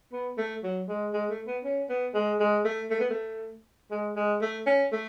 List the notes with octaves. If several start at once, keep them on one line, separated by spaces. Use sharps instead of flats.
B3
A3
F#3
G#3
G#3
A3
B3
C#4
B3
G#3
G#3
A3
A3
B3
A3
G#3
G#3
A3
C#4
A3